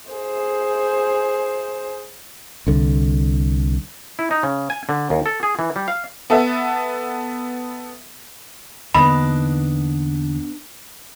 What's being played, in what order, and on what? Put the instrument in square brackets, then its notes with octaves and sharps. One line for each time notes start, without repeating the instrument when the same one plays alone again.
[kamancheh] G#4 C5
[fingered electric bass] C2 D3
[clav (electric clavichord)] E4
D#4
C#3
G#5
D3
D#2
A4
G#4
E3
G3
F5
[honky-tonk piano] B3 A4 E5
[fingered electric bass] E2 D3 A#3 [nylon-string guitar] B3 D4 D#4 [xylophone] B5